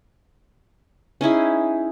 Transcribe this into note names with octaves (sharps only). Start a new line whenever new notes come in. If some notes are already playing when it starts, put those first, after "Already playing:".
C#4 D#4 E4 G#4